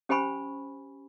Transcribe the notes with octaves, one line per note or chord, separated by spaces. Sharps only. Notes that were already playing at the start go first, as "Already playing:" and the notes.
C#4 G4 C5 G#5 B5 C#6